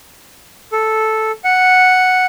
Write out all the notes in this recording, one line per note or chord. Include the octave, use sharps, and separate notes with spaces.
A4
F#5